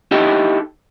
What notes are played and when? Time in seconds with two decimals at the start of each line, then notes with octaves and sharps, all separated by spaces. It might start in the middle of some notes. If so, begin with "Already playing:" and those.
0.11 D#4 E4 G4 A4 D#5 G5